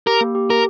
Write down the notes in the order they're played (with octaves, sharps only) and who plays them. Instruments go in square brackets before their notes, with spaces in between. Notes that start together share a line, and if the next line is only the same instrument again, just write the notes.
[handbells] G4 [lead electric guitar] A#4
[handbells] A#3
G4
[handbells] G4 [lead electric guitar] A#4